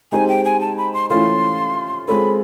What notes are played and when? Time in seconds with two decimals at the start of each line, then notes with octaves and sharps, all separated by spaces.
0.12 G#3 C4 D#4 G4 C5 G#5
0.28 G5
0.45 G#5
0.61 A5
0.77 B5
0.94 C6
1.10 E3 A3 C#4 F4 A4 C6
2.08 G#3 C4 F4 A4 C#5 B5